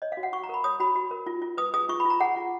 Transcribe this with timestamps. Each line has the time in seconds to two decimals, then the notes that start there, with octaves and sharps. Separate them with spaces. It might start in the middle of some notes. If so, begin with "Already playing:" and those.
0.02 C#5 D#5
0.12 F5
0.17 F#4
0.23 F#5
0.33 F#4 C#6
0.43 A#5
0.49 A#4 B5
0.64 C#5 D#6
0.80 F#4 B5
0.96 F#4
1.11 A#4
1.27 F4
1.42 F4
1.57 B4 D#6
1.74 G#4 D#6
1.89 F4 C#6
2.00 B5
2.05 F4
2.10 A#5
2.20 G#4 F#5
2.36 F4